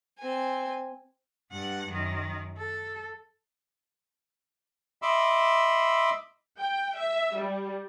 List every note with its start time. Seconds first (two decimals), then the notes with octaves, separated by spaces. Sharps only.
0.19 C4 G#5
1.52 G2 F#5
1.90 F#2 D#3
2.58 A4
5.02 D#5 E5 B5 C6 D6 E6
6.59 G5
6.96 E5
7.35 G3